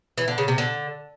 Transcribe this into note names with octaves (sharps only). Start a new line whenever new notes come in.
E3
D3
C#3
C3
D3